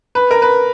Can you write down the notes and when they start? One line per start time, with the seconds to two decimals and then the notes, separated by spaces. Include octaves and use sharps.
0.15 B4
0.31 A#4
0.42 B4